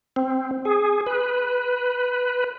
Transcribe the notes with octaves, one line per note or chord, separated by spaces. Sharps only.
C4
G#4
B4